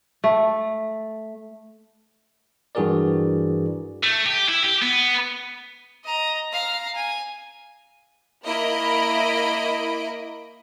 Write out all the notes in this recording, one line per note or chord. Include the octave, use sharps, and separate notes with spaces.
A3
G2 E3 F#4 G#4 A#4 D5
A3
G4
E4
G4
B3
D#5 A#5
F5 A#5
G#5
A#3 E4 D#5 B5 D7